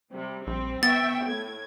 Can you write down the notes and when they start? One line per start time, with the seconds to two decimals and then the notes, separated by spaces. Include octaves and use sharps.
0.13 C3 G3
0.47 A#1 G3 C4
0.83 B3 E5 G5 C#6 A6
1.25 A2 G#6